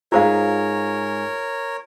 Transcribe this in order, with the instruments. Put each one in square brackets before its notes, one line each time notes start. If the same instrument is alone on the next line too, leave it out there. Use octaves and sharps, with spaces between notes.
[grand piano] G#2 G#4 A#5 [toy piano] F4 C5 F5 [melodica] A#4 C#5